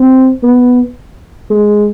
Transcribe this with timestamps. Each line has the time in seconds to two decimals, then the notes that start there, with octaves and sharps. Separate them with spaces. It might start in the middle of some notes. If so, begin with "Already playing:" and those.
Already playing: C4
0.43 B3
1.50 G#3